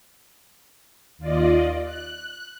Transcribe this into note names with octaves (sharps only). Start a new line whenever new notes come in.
D#2 F4 D5 D#5
F#6